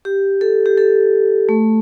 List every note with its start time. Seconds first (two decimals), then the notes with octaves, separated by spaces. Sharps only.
0.05 G4
0.41 A4
0.66 G4
0.77 A4
1.49 A3